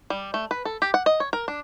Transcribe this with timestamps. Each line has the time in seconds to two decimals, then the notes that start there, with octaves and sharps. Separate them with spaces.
0.10 G3
0.34 A3
0.51 B4
0.65 A4
0.82 G4
0.94 F#5
1.06 D#5
1.20 C#5
1.33 A#4
1.48 D4